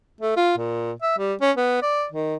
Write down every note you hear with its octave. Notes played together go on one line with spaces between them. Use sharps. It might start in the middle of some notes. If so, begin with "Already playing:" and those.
A3
F4
A#2
E5
G3
C#4
B3
D5
D#3